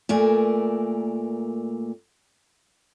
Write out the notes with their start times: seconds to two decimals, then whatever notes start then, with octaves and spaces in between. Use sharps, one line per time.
0.09 A#2 A3 A#4 D5 G#5